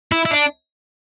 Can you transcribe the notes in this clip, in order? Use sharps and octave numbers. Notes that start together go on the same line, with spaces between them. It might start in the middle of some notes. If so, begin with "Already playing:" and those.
E4
E4
D4